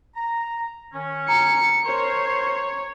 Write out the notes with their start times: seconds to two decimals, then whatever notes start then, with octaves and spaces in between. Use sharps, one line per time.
0.15 A#5
0.93 D#3 C#4
1.28 A#5 C#7
1.85 A#4 C5 C#5